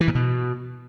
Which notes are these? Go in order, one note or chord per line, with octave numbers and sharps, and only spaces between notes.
E3
A#2
B2